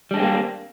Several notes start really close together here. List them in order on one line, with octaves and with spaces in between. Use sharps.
G3 D4 G#3 C4 A#3